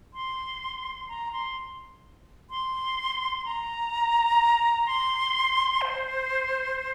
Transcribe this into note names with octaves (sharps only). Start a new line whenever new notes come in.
C6
A#5
C6
C6
A#5
C6
C5